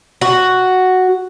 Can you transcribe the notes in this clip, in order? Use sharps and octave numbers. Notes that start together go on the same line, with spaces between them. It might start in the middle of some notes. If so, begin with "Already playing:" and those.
F#4